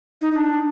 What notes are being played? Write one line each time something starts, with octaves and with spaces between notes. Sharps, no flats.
D#4
D#4
D4